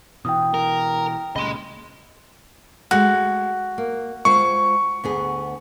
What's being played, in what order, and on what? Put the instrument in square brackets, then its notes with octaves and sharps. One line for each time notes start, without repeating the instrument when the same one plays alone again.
[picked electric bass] B2 E3 [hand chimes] G5 D#6
[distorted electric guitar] A#4
[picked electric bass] C#2 A#2 C#3 [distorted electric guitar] D#5 C6 [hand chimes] B5
[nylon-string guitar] G#3 A3 [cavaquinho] F#4
[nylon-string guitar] A#3
[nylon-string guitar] G#3 F4 C5 [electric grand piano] C#6
[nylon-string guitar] D2 B3 G#4